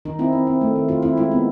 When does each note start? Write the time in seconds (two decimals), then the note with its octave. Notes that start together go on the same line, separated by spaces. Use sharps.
0.05 D#3 D#4
0.19 C4 E4
0.33 C4
0.47 C4
0.61 A3
0.76 D#3
0.89 D#3 F4
1.03 C4 E4
1.17 G#3 E4
1.31 B3